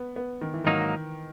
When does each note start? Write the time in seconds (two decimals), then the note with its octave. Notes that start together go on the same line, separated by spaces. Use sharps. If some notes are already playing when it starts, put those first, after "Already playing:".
Already playing: B3
0.16 B3
0.41 D#3
0.54 E3
0.64 G#2 D#3 F#3 A#3 D#4